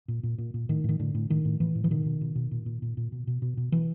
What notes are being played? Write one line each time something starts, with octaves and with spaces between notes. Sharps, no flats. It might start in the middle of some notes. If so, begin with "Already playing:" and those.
A#2
A#2
A#2
A#2
A2 D#3
A2 D#3
A2 D3
A2
A2 D#3
A2
A2 E3
A2
E3
B2 D#3
B2
B2
B2
A#2
A#2
A#2
A#2
B2
B2
B2
B2
B2 E3